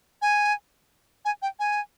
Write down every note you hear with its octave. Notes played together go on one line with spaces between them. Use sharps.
G#5
G#5
G5
G#5